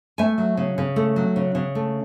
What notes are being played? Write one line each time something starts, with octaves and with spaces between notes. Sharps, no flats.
A3 E5 G#5
F#3
C#3
C#3
A3
F#3
C#3
C#3
A3